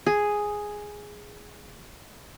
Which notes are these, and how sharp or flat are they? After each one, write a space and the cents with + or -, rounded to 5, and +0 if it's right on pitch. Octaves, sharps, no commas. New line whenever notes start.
G#4 +0